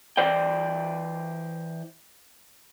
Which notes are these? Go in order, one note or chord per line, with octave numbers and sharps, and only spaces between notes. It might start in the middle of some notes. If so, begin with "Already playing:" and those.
E3 C5 D5 G5